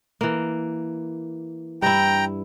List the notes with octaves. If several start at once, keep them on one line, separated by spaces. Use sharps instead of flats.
E3 A#3
G2 E4 G5 A#5